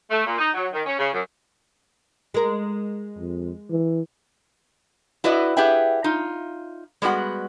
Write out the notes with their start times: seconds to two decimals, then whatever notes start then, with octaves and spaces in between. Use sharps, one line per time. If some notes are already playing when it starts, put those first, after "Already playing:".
0.11 A3
0.26 A#2
0.38 D#4
0.54 F#3
0.73 D#3
0.86 C#4
0.99 C#3
1.13 F#2
2.34 G#3 A#4
3.19 F2
3.71 E3
5.24 E4 F#4 B4 D5 D#5
5.57 G4 G#4 B4 E5 F#5 G5
6.04 D#4 F4
7.02 G3 G#3 B3 F#4 F#5